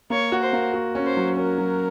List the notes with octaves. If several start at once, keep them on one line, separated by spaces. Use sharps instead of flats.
A#3 C#5
F#4
C5
A#3
F#4
C#4
C5
F#3
C#4 A#4
F#3